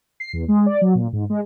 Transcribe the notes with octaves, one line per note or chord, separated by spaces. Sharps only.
C7
E2
G#3
D5
F#3
A#2
G#2
G#3